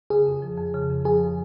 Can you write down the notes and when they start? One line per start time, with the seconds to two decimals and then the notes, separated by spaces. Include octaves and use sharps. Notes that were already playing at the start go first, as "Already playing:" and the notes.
0.10 C#3 G#4
0.27 F2
0.42 F3
0.58 F2
0.74 C#3
0.90 F2
1.05 F3 G#4